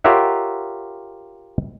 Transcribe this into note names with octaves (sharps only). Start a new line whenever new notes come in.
F4 G4 A#4 C#5 E5 F#5